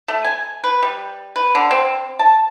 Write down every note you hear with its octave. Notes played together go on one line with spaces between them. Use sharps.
A3
G#5
B4
G3
B4
D3
C4
A5